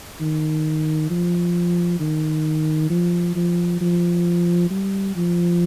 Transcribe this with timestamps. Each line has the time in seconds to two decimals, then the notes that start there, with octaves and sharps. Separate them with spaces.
0.20 D#3
1.10 F3
2.00 D#3
2.90 F3
3.36 F3
3.81 F3
4.70 G3
5.16 F3